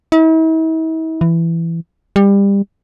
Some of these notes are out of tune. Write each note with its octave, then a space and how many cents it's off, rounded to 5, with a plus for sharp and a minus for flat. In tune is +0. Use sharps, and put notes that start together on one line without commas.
E4 -45
E3 +15
G3 +25